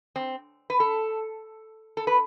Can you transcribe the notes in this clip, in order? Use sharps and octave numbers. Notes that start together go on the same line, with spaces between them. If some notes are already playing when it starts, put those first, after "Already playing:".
C4
B4
A4
A4
B4